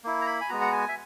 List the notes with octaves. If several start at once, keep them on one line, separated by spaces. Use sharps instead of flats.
A#3 E4
A#5
B5
G#5
G#3 B3 F#4 A#5
F#5
G#5
E5